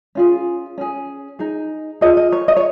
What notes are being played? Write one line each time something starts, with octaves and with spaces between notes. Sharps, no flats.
C#4 F4 G#4
C#4 G#4
D#4 G#4
F4 G#4 D#5
D#5
C#5
D#5
C#5